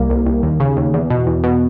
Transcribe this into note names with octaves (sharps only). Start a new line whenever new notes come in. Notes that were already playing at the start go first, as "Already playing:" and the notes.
Already playing: C2 A#3
C2
C2
D#2
C#3
D#2
E2
B2
E2
B2